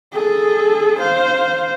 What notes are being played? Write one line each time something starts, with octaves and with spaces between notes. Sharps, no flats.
G#4 A4
C5 F5